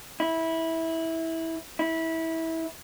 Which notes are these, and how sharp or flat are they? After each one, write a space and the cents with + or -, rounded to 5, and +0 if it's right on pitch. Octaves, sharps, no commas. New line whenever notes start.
E4 -15
E4 -20